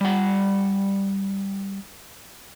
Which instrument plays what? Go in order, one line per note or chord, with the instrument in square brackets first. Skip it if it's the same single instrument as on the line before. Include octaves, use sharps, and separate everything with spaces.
[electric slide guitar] G3 F#5